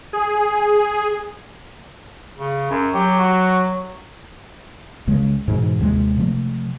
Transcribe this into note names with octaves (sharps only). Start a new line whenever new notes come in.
G#4
C#3
F#2
F#3 G4
F#4
C2 C#3 G#3
G#2 B2 E3
D#2 C3 G3 G#3
C3 F3 A3